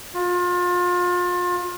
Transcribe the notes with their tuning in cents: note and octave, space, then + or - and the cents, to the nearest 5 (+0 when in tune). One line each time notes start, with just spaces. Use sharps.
F4 +30